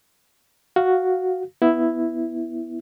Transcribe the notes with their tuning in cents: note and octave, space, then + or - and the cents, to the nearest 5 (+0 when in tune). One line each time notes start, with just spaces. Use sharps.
F#4 +0 F5 +0
B3 +0 E4 +0